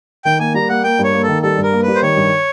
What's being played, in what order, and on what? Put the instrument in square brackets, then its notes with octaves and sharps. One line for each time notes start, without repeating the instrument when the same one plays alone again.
[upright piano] D#3 [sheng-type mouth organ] G5
[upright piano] A#3 [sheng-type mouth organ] G#5
[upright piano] G3 [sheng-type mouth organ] A#5
[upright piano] A#3 [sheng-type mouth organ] F#5
[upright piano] A#3 [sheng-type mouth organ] G5
[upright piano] G2
[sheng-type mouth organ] C#5
[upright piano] A#3
[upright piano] D#3 [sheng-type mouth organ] A4
[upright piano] G3 [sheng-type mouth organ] A4
[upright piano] G2
[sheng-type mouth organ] A#4
[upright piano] A#3
[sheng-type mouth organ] B4
[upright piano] G3
[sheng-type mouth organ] C5
[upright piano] D#3 [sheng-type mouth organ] C#5
[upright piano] G2